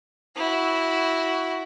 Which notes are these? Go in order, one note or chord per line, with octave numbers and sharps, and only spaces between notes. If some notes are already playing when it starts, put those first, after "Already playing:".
E4 F#4